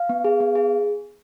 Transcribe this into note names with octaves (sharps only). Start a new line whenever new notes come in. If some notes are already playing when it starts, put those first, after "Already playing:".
Already playing: F5
B3
G#4
B3
G#4